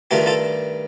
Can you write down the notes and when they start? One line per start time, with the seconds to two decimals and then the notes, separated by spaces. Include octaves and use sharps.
0.11 G2 D#3 A3 D4 F4 G4
0.26 F4 A4